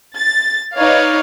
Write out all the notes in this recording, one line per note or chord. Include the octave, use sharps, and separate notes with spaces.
A6
D#4 B4 C#5 D5 F5